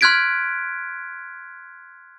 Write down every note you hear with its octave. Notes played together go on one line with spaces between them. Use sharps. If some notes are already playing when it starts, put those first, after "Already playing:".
C6 F6 F#6 G#6 B6 D7